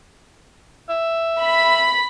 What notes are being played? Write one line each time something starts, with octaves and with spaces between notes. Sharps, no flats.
E5
B5